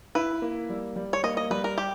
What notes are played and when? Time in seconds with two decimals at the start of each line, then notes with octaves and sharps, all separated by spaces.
0.15 E4 B4
0.42 A#3
0.70 G3
0.96 G3
1.13 C#5
1.23 A#3 D#5
1.37 D#5
1.50 G3 B4
1.64 A#4
1.78 G4